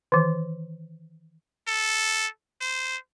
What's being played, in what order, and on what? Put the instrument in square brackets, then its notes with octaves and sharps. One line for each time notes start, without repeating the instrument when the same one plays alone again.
[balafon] D#3 E3
[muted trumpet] A4
C5